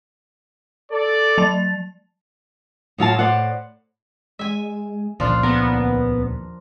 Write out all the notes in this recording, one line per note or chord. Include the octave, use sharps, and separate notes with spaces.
A4 D5
F#3 A5 A6
A2 F#3 F4 A5
A2 C5 D5 F#5
G#3 E5 G#5
G1 C#2 A#2 F3 D4 F4
D#2 B3 A#4